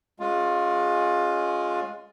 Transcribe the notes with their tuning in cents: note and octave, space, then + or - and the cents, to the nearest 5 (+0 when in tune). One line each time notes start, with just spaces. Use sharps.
G#3 +5 C#4 +0 F4 +20